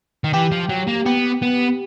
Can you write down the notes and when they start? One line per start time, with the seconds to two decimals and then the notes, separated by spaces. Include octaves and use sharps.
0.24 D#3
0.33 E3 G4
0.52 F3
0.70 F#3
0.88 A#3
1.06 B3 G4
1.42 B3